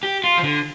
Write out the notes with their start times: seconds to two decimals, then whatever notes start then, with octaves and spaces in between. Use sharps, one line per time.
0.03 G4
0.24 F4
0.38 F3
0.44 D3